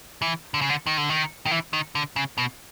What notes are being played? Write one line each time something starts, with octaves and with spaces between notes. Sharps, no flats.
E3
D3
C#3
D3
D#3
D3
D#3
D#3
E3
D#3
D3
C#3
B2